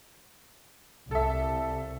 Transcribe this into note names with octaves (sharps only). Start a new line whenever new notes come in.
C2 A4 E5